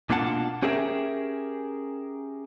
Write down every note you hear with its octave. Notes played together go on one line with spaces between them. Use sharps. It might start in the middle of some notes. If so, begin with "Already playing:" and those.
B2 A#3 D4 F4 F#5 A5
C#4 G4 G#4 A#4 E5